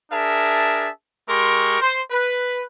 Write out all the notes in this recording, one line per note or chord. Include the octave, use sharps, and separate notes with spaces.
D4 G#4 A#4 E5 A5
G#3 G4 A#4 C6 C#6
C5
B4